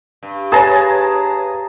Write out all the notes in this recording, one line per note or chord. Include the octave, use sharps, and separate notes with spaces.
G2
G#4 B4 C#5 A5 A#5